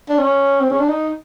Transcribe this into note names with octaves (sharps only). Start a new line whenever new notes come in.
D4
C#4
C4
C#4
D4
D#4